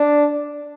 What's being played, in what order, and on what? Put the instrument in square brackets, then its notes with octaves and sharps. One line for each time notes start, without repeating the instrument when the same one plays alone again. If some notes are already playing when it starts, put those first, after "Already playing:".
Already playing: [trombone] D4